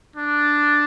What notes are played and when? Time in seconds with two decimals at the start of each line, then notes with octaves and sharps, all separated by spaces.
0.16 D4